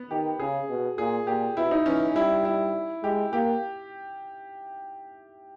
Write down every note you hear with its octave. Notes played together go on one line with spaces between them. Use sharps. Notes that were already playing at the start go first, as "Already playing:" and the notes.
Already playing: B3
D#3 G4
C#3 G#4
B2
A#2 G#4
A#2 G4
B2 E4
D#4
E3 C#4
G3 E4
E4
G#3 G4
A#3 G4